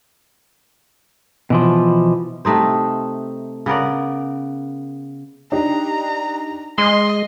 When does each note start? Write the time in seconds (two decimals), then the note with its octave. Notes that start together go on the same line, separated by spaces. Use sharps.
1.50 B2 E3 F3
2.45 C3 A3 D#4 C5
3.66 C#3 B3 A#4 D5
5.52 D4 D#4 G4 A#5
6.78 G#3 D#5 C6 D#6